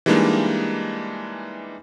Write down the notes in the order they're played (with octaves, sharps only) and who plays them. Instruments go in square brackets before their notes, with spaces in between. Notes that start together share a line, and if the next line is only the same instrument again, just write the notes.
[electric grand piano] E3 G3 G#3 A#3 D4 D#4